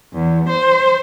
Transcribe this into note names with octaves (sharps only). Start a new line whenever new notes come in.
E2
C5